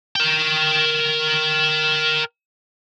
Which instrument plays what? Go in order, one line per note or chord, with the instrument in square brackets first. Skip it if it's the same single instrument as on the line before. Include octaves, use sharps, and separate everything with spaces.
[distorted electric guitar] A#4 G5